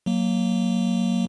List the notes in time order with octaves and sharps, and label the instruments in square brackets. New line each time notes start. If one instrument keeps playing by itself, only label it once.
[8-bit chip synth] F#3 A#3